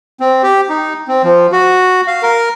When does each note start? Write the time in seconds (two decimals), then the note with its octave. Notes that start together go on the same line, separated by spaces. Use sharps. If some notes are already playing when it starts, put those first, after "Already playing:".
0.20 C4
0.43 G4
0.69 D#4
1.08 C4
1.23 F3
1.52 F#4
2.08 F5
2.23 A#4